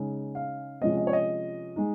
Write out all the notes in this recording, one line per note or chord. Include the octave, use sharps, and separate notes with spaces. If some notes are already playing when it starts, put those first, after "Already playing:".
Already playing: C#3 G#3 D#4
F5
C3 F3 G#3 C#4 D#5
D#5
C#5
D#5
G#3 D#4